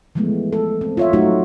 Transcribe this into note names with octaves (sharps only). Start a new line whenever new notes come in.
E3 F3 G#3 A3 B3
A4
C4
F4 C#5 E5
F#3 A3 D#4 F4 F#4